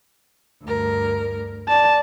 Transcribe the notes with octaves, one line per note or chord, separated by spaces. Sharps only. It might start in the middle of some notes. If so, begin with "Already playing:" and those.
D2 G2 A#4
D5 A5